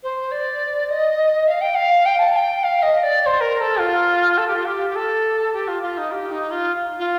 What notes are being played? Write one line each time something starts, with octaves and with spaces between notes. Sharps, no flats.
C5
D5
D#5
F5
G5
F5
G5
A5
A5
G5
F5
D#5
D5
D5
C5
A#4
A4
F4
A4
G4
F4
G4
G4
A4
G4
F4
F4
D#4
G4
D#4
F4
F4